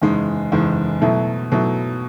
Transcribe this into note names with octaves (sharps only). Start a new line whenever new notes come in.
F#1 E2 D#3 G#3 D#4
F#1 E2 D#3 G#3 D#4
B2 F#3 A3 E4
B2 F#3 A3 E4